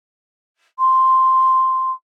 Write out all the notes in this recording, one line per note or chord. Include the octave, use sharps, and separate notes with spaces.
C6